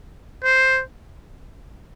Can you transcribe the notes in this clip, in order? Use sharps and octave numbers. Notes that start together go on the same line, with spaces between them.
C5